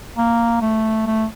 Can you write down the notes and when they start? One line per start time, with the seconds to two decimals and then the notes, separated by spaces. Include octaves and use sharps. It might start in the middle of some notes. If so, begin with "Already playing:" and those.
0.17 A#3
0.61 A3
1.06 A3